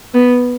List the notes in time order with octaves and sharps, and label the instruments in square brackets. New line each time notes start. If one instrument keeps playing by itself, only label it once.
[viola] B3